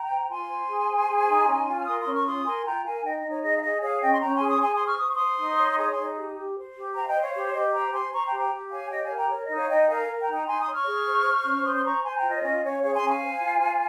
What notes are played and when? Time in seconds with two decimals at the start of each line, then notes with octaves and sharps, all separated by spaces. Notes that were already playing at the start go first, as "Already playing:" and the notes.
Already playing: G5 A#5
0.11 C5
0.30 F4 G#5 C6
0.49 C5
0.69 G#4
0.89 C5
1.08 G#4
1.28 D#4
1.47 C#4
1.67 F4
1.79 F6
1.86 A#4 C6 D#6
1.99 C6 D#6
2.06 C#4
2.13 C#6 F6
2.25 F4 C6 D#6
2.45 A#4 G#5 C6
2.65 F4 G5 A#5
2.84 A#4 F5 G#5
3.03 D#4 D#5 G5
3.17 D#5
3.24 D#4
3.30 C#5
3.43 G#4 D#5
3.58 F5
3.62 G#4 D#5
3.82 G#4 C#5 F5
4.02 C#4 D#5 G5
4.12 C6
4.21 C#4 G5 A#5
4.34 G#5 C6
4.41 G#4
4.48 C6 D#6
4.54 C#6
4.60 G#4 G#5 C6
4.73 C6 D#6
4.79 C5
4.86 C#6 F6
4.99 C5 D#6
5.07 C#6
5.15 C6 D#6
5.20 C5
5.39 D#4
5.58 C#5
5.78 G#4 C6 D#6
5.91 G#5 C6
5.98 D#4
6.16 G4
6.36 G4
6.57 C5
6.76 G4
6.94 C5 G5 A#5
7.04 F5
7.08 D#5 G5
7.14 C5
7.21 C#5 F5
7.34 G4 C#5
7.53 G4 D#5
7.73 C5 G5 A#5
7.92 C5 G#5 C6
8.12 C5 A#5 C#6
8.25 G5 A#5
8.33 G4
8.38 G5 A#5
8.52 G4
8.71 C#5 F5 G#5
8.90 G4 D#5 G5
9.03 F5 G#5
9.11 A#4
9.16 G5 A#5
9.30 A#4 C#5
9.43 D#5
9.49 D#4
9.56 C#5 F5
9.68 D#4 D#5 G5
9.89 A#4 F5 G#5
10.08 A#4
10.21 G5 A#5
10.28 D#4
10.34 G5 A#5
10.47 D#4 G#5 C6
10.60 C6 D#6
10.66 C#5
10.73 C#6 F6
10.86 G#4
11.06 C5
11.25 C5
11.45 C#4
11.64 C5 C6 D#6
11.75 C6
11.84 C5 A#5 C#6
12.03 C5 G#5 C6
12.16 G5 A#5
12.22 F4
12.30 D#5
12.37 C#5
12.42 C#4 D#5
12.62 C#4 C#5 F5
12.81 G#4 C#5 F5
12.94 G#5 C6
13.01 C#4
13.08 F5 G#5
13.21 C5
13.40 F4
13.60 F4